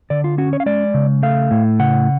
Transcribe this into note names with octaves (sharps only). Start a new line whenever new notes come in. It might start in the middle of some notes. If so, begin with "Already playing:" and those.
D3 D5
F4
C#4 F#4
C#5
F5
G#3 D5
C#3
A3 F5
A2
C#3 F#5